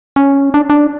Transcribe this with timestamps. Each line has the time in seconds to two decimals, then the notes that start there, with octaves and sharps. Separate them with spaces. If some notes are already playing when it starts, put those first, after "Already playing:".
0.16 C#4
0.54 D4
0.70 D4